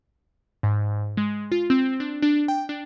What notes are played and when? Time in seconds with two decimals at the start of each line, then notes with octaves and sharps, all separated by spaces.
0.63 G#2
1.17 G#3
1.52 F4
1.70 C4
2.00 D4
2.22 D4
2.48 G5
2.69 D4